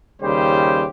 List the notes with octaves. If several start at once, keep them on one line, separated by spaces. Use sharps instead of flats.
D#2 C#3 G3 G4 C5